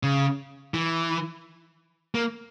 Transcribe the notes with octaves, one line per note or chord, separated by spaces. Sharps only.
C#3
E3
A#3